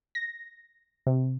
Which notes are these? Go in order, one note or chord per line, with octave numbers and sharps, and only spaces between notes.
A#6
C3